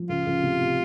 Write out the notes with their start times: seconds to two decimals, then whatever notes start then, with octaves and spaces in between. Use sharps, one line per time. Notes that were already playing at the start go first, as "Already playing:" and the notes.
Already playing: F3
0.09 C#2 F4
0.26 C#2
0.43 C3
0.61 C3